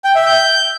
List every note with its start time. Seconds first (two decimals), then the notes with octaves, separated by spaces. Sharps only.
0.04 G5
0.15 E5
0.26 G6